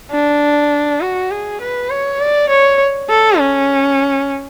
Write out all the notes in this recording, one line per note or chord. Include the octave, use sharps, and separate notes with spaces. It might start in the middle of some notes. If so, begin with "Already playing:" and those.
D4
F#4
G#4
B4
C#5
D5
C#5
A4
C#4